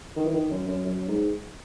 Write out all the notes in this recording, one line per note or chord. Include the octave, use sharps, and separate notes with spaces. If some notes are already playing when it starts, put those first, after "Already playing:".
D#3
E3
D#3
F#2
F#2
F#2
G#2